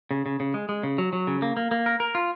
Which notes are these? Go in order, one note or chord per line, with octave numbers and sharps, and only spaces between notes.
C#3
C#3
C#3
G#3
G#3
C#3
F#3
F#3
C#3
A#3
A#3
A#3
A#4
A#4
F4